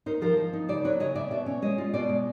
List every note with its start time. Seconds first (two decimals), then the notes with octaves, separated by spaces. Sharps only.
0.06 D#4 A#4 C5
0.22 F3 A#4 C5
0.38 F3
0.53 D#4
0.69 C#3 C5 D5
0.84 F#3 B4 C#5
1.00 C#3 C#5 D#5
1.15 C#3 D5 E5
1.31 B2 D5 E5
1.46 C#4
1.62 G#3 C#5 D#5
1.78 F4
1.93 B2 C5 D5
2.09 G#3